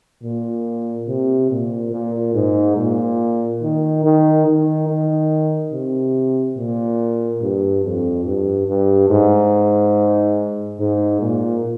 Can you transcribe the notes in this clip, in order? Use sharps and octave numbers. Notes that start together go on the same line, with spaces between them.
A#2
C3
A#2
A#2
G#2
A#2
D#3
D#3
D#3
D#3
C3
A#2
G2
F2
G2
G2
G#2
G#2
A#2